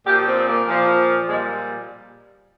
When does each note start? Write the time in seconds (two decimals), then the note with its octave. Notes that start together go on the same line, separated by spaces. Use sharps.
0.07 A#2 F3 G4
0.27 C4
0.38 C4
0.47 A#3
0.67 A#2 F3
1.28 A#2 G3 G#3